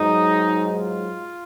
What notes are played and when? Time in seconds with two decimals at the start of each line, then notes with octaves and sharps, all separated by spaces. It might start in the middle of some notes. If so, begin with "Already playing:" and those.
Already playing: G#2 F#3 D#4
0.75 F4